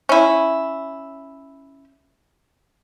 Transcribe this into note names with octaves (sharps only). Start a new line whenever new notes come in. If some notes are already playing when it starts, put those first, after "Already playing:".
C#4 E4